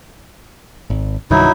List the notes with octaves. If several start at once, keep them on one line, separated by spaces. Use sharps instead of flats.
G#1
C2 G2 D#3 F#3 D#4 E4